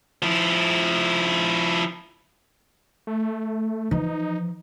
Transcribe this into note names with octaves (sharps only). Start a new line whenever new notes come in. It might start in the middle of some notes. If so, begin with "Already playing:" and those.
F3 E4
A3
E3 F3 D#4